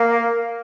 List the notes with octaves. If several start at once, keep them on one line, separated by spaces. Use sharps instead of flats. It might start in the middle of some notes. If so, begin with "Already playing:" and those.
Already playing: A#3